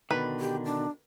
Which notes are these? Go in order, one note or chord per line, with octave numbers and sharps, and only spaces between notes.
B2 D3 D#3 B4
G4
D4